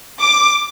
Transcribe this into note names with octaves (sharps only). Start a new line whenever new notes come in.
D6